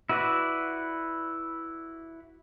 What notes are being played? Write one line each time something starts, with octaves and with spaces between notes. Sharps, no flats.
E4 F#4 B4 D5